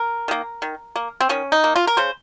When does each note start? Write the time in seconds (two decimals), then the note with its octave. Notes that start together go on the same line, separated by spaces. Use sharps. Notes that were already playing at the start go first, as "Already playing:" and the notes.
Already playing: A#4
0.28 D#3 A#3
0.62 D#3
0.96 A#3
1.21 C4
1.29 D#3 C#4
1.52 D#4
1.64 A#3
1.76 F4
1.87 A#4
1.97 C#3 C5